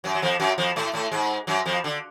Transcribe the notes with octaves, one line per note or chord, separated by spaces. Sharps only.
F#2 F#3
F#3
F2 F3
F#2 F#3
F2 F3
A2 A3
A2 A3
G#2 G#3
F#2 F#3
F2 F3
D3